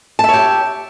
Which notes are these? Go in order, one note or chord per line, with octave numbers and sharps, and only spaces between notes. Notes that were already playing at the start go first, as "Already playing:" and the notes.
G4 C#5 E5 A5